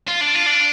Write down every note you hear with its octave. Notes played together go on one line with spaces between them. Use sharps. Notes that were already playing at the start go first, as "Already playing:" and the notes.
F4
D4
F4
D4